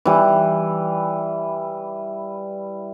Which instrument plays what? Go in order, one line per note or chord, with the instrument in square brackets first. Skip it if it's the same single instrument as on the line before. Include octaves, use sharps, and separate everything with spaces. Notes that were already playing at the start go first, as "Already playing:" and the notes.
[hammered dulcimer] E3 G3